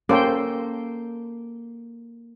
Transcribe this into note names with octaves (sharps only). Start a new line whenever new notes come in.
A#3 C#4 A4 C5 G5